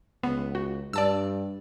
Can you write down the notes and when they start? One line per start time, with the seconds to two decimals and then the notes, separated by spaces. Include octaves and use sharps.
0.23 C#2 B3
0.55 F#4
0.93 G2 D5 A5 E6